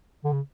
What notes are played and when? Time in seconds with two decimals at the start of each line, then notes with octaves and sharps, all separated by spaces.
0.24 D3
0.32 C#3